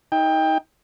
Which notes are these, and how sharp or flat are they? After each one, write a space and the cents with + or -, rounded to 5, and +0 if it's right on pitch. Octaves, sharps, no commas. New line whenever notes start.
D#4 +25 G5 +20